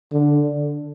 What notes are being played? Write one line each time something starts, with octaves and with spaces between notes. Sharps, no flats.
D3